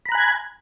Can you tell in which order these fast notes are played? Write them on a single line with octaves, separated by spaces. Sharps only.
B5 A#5 F#6 G#5 G#6